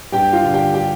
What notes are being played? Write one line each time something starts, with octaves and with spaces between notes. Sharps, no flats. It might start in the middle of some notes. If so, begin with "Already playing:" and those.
G2 G4 G5
F4 F5
D3 G3
G4 G5
G4 G5